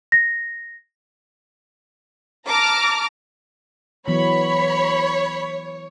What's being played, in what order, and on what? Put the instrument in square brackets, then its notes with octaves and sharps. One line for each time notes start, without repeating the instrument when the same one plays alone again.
[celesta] A#6
[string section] A5 A#5 D6 F6 A#6
[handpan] E3 F#3 B3 [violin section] C#5 [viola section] B5